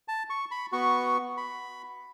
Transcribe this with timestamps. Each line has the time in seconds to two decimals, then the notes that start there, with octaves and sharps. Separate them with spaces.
0.08 A5
0.30 C#6
0.51 B5
0.72 B3 F#4 C#6
1.37 B5